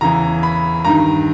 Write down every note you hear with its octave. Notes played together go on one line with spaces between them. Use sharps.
E2 C#3 E3 A#5
B5
G2 D#3 A#5